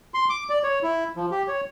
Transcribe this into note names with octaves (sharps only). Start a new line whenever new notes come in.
C6
D6
D5
C#5
E4
F3
G4
C#5